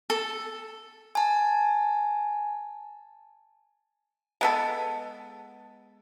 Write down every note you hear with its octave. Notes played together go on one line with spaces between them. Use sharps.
A4
G#5 A5
G#3 B3 A4